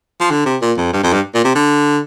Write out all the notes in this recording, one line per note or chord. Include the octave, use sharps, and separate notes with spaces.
F3
D3
C3
A#2
F2
G2
F2
G2
A#2
C3
D3